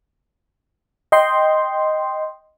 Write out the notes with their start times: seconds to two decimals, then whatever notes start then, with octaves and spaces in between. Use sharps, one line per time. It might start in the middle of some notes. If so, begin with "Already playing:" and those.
1.12 D#5 G5 C6